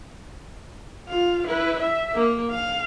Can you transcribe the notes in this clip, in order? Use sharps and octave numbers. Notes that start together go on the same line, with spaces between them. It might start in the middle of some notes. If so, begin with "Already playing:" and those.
F4 F5
E4 B4
E5
A#3
F5